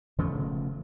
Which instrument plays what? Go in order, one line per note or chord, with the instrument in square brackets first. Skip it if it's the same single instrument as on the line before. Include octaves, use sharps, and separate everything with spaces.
[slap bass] E1 C#3 F3 A3